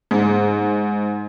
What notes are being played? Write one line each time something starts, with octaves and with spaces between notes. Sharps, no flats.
G#2